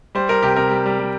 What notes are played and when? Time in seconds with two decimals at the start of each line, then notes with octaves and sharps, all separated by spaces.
0.15 G3 C5
0.29 G3 A#4
0.43 C3 G4
0.56 C3 A#4
0.71 G3
0.86 G3
0.99 G3